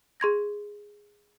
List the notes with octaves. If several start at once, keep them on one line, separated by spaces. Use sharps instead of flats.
G#4 C6 G#6 A#6